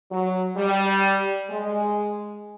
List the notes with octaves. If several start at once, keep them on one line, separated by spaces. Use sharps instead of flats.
F#3
G3
G#3